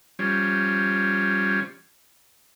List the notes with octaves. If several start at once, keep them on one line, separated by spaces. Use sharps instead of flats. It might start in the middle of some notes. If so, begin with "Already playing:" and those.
F3 G3 C#4